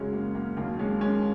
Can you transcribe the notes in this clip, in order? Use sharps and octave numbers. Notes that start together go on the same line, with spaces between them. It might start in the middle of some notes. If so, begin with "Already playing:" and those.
Already playing: F#2 C#3 F#3 G#3 C#4
A#3
A#3
D#2 D#3 F#3 A#3
G#3 C#4
G#3 C#4